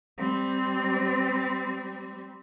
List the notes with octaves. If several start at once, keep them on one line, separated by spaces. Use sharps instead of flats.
G3 C4